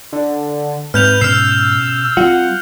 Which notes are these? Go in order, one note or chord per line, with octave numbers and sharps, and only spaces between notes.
D3
G#2 C4 B4 F6 G6 F7
B2 C#4 E6 F6 C7
G3 B3 C4 F4 F#5